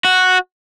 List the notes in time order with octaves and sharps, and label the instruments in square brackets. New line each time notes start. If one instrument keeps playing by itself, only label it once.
[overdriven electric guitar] F#4